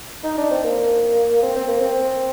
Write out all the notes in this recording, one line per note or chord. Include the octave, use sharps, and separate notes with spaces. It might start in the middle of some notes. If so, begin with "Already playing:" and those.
D#4
D4
C4
A#3
C4
C4
A#3
C4